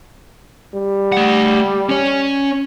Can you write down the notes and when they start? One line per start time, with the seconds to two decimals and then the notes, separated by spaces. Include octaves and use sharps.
0.74 G3
1.12 A3 F#5
1.90 C#4 C#5